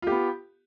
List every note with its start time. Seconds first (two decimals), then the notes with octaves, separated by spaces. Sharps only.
0.02 F4
0.07 G4
0.11 B3